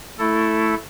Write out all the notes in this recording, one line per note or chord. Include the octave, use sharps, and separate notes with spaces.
A3 E4 A4